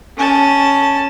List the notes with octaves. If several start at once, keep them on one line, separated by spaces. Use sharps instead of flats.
C#4 A5